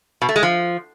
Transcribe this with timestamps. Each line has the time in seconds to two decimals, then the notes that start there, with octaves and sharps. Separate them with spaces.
0.22 B2
0.29 A3
0.36 G#3
0.43 F3